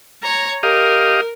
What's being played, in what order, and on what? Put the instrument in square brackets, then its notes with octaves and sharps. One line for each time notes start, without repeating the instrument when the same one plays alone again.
[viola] C#5 A#5
[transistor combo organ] G4 D#5 F5 [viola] A#4